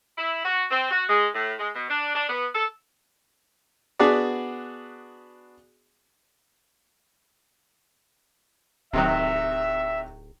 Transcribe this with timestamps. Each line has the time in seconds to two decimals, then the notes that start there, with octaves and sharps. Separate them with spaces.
0.18 E4
0.45 F#4
0.71 C4
0.91 F#4
1.09 G#3
1.35 A2
1.59 G#3
1.75 B2
1.90 D4
2.15 D4
2.29 B3
2.55 A4
3.99 B3 D4 F#4 G#4 B4 D5
8.93 D1 C3 D#3 F#3 E5